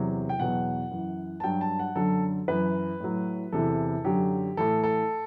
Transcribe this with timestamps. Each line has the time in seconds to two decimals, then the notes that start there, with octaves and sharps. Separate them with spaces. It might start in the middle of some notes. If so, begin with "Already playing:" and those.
Already playing: E2 C3 F#3
0.29 G5
0.39 E2 B2 F#3 F#5
0.91 F#2 E3
1.40 A5
1.44 G2 F#3 G5
1.61 A5
1.79 F#5
1.96 F#2 D3 F#3 A4
2.48 F#2 E3 B4
3.00 A2 F#3
3.52 E2 C3 E3 A4
4.04 F#2 D3 F#3 G4
4.57 A2 E3 A4
4.83 A4